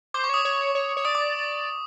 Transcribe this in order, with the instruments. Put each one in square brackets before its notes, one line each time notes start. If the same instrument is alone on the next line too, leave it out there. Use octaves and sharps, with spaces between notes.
[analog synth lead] C5 [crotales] D6
[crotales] C#6
[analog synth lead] C#5 [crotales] D#6
[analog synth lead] C#5
C#5
C#5
[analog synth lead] D5 [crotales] D#6
[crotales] D6